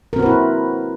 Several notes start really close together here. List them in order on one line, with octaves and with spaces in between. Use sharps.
A#4 C4 F#4 B4 E4